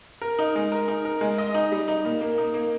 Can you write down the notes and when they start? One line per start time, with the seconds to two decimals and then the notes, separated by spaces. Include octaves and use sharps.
0.21 A#4
0.39 D#4
0.55 G#3
0.72 A#4
0.88 D#4
1.05 A#4
1.21 G#3
1.38 D#5
1.55 D#4
1.72 G3
1.88 D#4
2.05 A#2
2.21 A#3
2.38 D#4
2.54 A#3